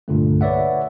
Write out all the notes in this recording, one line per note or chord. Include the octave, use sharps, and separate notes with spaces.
C2 G2 A#2 D3 A3
B4 C#5 D5 E5 F#5